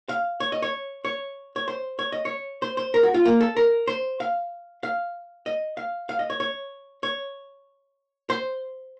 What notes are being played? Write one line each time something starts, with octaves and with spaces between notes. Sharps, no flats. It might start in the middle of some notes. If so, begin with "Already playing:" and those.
F5
C#5
D#5
C#5
C#5
C#5
C5
C#5
D#5
C#5
C5
C5
A#4
F#4
F4
A#3
A4
A#4
C5
F5
F5
D#5
F5
F5
D#5
C#5
C#5
C#5
C5